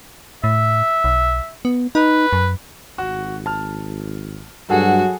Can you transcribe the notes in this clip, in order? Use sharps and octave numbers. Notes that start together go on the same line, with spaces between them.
A2 E5
B1
B3
D#4 B4
F#2
G#1 F#4
A5 F6
G2 F#3 F#4 G#4 A4 F#5